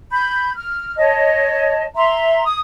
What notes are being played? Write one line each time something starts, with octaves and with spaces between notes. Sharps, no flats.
B5 G6
F6
C#5 D#5 A5
E5 A#5 C6
D#6